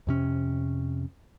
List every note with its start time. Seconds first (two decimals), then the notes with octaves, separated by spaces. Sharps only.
0.07 F2 C3 C#4